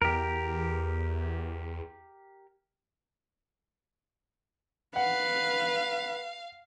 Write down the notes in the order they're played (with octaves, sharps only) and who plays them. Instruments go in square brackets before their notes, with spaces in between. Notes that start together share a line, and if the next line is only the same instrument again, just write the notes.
[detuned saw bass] E2 [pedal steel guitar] G4 A#4
[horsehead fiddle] B4 [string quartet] F5 [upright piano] F#5